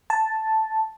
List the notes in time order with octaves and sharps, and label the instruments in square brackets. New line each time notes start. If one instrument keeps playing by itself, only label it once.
[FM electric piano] A5